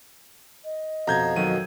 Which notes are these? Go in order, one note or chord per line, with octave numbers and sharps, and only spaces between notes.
D#5
F2 B2 A#5 G6 G#6
D#3 F#3 D#7